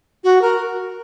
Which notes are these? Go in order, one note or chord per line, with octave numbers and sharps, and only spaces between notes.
F#4
A#4